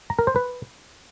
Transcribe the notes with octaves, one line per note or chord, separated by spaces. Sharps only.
A#5
A#4
C5
B4